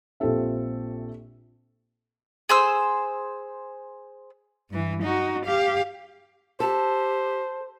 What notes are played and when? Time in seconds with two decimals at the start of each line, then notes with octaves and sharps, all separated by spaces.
0.20 A#1 C4 F4 G4 A4 E5
2.49 G#4 C5 E6
4.71 G2 E3
5.03 D#4 F#4
5.46 G4 F5
6.60 G4 A4 C5